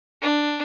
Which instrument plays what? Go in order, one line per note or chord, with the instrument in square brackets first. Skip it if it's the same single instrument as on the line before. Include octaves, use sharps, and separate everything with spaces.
[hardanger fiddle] D4